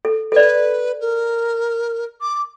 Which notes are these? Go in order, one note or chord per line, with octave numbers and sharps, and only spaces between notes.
A4
A4 B4 D5
A#4
D6